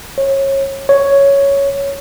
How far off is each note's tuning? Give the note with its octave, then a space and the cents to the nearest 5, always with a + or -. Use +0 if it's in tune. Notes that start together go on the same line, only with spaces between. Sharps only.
C#5 -25
C#5 +5